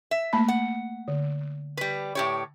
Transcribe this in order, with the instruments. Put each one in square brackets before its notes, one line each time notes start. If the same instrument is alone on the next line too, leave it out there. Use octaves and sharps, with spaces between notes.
[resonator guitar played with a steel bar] E5
[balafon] A3 A#3 B5
[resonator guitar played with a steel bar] F#5
[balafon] D3
[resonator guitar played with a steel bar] G3 B4
A2 G4 C#5